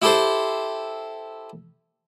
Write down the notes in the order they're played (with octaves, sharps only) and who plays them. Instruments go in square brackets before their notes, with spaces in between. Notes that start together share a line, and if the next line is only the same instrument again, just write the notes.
[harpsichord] E4 G4 A4 C5